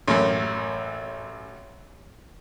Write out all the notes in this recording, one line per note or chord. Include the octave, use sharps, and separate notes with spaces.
A1 F#2